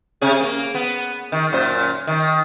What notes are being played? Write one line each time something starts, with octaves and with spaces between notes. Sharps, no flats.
C3 C#4 G#4
A#3
B3
D#3
F#2 A#2 C5
D#3